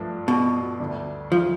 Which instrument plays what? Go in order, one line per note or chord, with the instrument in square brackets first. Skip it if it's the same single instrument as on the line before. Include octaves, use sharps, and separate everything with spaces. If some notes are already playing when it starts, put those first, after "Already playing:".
Already playing: [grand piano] G2 F3 A3 D4
[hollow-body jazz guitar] B2
[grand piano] D2 D3 G3 D4
[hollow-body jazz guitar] F3